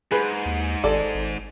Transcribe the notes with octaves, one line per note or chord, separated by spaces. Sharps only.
G#2 G#4 B4
D#2
G#1 A4 D5
G#1